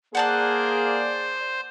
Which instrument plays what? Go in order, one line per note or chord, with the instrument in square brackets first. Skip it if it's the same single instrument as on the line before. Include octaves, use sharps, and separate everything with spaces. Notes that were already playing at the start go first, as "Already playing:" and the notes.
[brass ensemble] A#3 G#4 [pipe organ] C5 [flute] D5 [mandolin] F#5 A5 F#6